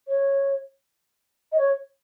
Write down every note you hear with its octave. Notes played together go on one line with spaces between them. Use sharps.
C#5
D#5
C#5